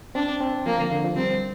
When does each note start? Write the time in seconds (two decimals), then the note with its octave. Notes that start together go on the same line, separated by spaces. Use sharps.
0.15 C4 D4
0.41 C4
0.66 F3 A#3
0.78 D3
0.92 D3
1.04 F3
1.16 G3 C4